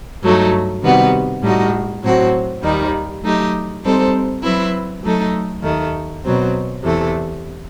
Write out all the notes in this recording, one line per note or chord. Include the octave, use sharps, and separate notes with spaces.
G2 F#3 A3 D#4
C3 D#3 G3 B3 F#4
A2 G3 D#4 F#4
A2 F#3 C4 F#4
D#2 D#3 G3 D#4
F#3 A3 D#4 G4
G3 C4 D#4 A4 C5
F#3 C4 E4 B4
F#3 A3 D#4 A4
D#2 D#3 A3
B2 F#3 C4
E2 C3 E3 A3